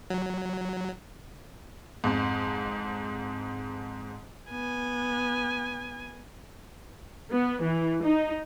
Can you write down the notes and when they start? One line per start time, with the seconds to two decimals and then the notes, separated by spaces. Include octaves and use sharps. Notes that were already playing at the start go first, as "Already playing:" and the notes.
0.10 F#3
2.04 F2 G#2
4.50 B3 G#5
7.31 B3
7.61 E3
8.03 D#4